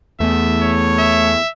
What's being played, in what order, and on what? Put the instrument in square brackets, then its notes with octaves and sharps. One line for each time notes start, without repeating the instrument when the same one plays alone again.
[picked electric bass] E2 B3 [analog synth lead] A3 [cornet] E5
[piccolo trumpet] C#5
[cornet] E5